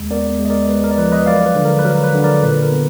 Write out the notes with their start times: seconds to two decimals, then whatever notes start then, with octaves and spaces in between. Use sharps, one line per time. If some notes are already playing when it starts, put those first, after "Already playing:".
Already playing: D#2 G#3
0.11 B3 A#4 D5
0.39 G#3
0.45 D#5
0.50 A#4 D5
0.69 G#3 B4
0.84 A#4
0.91 D5
0.98 F3 B4
1.12 B4 D#5
1.26 F#3 D5 F5
1.46 B4
1.55 D3
1.65 A#4
1.79 B4
1.85 F#3 A#4
2.04 B4
2.14 D3
2.24 A#4 D5
2.43 A#2 B4
2.63 A#4
2.72 B3